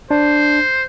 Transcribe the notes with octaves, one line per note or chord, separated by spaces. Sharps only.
D4 C5